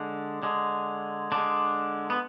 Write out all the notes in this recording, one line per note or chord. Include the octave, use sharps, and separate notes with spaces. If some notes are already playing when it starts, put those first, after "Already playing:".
Already playing: D3 G#3 D4
D3 G#3
D3 G#3 D4
B3